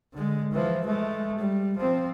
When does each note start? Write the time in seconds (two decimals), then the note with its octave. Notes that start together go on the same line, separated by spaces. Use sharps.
0.13 D3 G#3
0.52 E3 F3
0.84 G#3 A3
1.38 G3
1.78 F3 C4